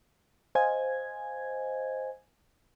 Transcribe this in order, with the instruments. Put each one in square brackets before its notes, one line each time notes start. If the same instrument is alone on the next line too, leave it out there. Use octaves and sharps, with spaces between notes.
[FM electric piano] C5 D#5 F5 G#5 G#6